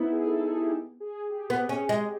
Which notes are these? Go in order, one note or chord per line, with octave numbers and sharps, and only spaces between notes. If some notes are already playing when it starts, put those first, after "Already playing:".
Already playing: B3 D#4 E4
G#4
A4
G#4
G4
G#4
G4
B3
C#4
G#3